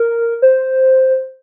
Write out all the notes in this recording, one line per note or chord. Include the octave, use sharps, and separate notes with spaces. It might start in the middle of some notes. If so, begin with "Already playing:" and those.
Already playing: A#4
C5